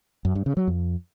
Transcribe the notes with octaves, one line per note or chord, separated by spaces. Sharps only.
F#2
G2
C#3
F#3
F2